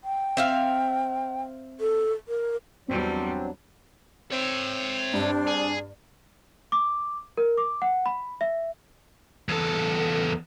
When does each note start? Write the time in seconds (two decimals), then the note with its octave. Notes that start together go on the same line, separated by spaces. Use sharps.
0.04 G5
0.37 C4 E5 F5
1.80 A4
2.28 A#4
2.88 E2 F#3 G3 C4 D4
4.32 C4 C#5 E5
5.13 G2 D4
5.47 G#4
6.72 D6
7.37 A#4
7.58 D6
7.82 F#5
8.06 B5
8.41 E5
9.49 E2 A4